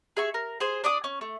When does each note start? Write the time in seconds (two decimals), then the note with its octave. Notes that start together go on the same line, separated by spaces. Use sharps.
0.17 G#4 E5 C#6
0.34 A#4
0.60 G#4 C5
0.84 D4 D5 D6 D#6
1.04 C#4
1.21 A3